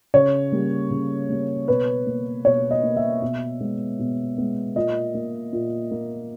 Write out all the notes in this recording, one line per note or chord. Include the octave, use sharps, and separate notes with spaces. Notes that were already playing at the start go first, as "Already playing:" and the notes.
C#3 C#5
G3 A#3
C#3
G3 A#3
B2 B4
A#3
B2 C#5
D#5
A#3
E5
B2
G#3 B3
B2
G#3 B3
A#2 D#5
A#3
A#2
A#3